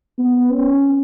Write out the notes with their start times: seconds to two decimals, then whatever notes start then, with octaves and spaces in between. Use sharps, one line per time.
0.18 B3
0.51 C#4